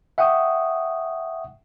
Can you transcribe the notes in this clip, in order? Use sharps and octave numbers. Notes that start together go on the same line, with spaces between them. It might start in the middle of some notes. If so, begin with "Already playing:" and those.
E5 F#5 G5 C#6 D#6